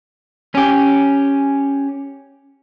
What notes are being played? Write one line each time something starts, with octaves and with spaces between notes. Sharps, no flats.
C#4 G4